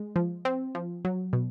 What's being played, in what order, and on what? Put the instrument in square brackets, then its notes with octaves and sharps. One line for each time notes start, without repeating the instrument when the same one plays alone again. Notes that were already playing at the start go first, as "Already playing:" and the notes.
Already playing: [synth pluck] G#3
F3
C4
F3
F#3
B2